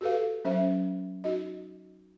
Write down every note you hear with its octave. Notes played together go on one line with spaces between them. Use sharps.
F#4 G4 A4 B4 F5
F#3 C#4 C5 E5
D#4 F#4 D#5